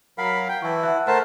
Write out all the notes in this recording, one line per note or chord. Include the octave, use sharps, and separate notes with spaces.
F#3 A#4 F5 F#5 B5 B6
G5
E3 E4 A5 C#6
E5 F#5 A5 F#6
A3 A#4 C5 F#5 A5 F6